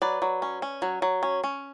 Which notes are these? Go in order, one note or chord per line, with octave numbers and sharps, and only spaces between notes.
F#3 B4 D5
F#3
C#4
C#4
F#3
F#3
C#4
C#4